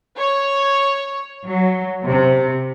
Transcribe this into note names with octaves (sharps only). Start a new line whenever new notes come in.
C#5
F#3
C3